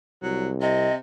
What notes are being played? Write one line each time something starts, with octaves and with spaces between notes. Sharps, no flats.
C2 F#3
C3 D#5